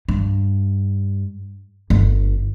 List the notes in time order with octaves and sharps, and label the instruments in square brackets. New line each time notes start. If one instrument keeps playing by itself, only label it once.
[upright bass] G2
G1